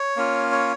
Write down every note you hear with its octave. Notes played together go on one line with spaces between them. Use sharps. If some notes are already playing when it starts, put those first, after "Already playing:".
Already playing: C#5
A#3 C#4 F4
C#5